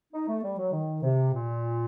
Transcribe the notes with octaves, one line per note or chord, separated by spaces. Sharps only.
D#4
A3
G3
F#3
D#3
C3
A#2